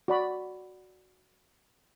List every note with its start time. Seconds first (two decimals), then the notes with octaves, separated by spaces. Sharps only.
0.08 F#4 D5 B5